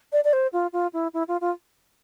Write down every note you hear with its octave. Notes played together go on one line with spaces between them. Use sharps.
D5
D5
C5
F4
F4
E4
E4
F4
F4